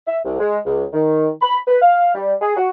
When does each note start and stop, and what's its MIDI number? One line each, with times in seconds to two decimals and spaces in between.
0.07 0.18 76
0.24 0.37 36
0.39 0.59 56
0.65 0.84 37
0.93 1.29 51
1.42 1.59 83
1.67 1.78 71
1.81 2.14 77
2.15 2.34 55
2.41 2.54 68
2.57 2.69 66